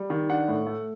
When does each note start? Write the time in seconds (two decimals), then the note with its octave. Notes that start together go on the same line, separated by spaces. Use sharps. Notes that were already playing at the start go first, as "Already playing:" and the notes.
Already playing: G3
0.10 D#3
0.30 D4 F#5
0.48 A2
0.67 A3